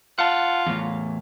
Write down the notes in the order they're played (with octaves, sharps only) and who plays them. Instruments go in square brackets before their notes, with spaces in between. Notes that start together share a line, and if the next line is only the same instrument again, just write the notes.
[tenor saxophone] F4 [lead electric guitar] F#5 A5
[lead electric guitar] E2 A2